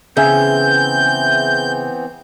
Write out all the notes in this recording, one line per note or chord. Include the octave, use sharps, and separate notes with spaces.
C#3 E3 B3 C4 G#4 E5 G#5 G6